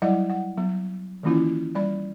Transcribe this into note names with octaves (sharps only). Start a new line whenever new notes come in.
F#3 G3 E4 D5 D#5 F#5
F#5
F#3 B3
D#3 E3 A#3 C#4 E4 F4
G3 D5 B5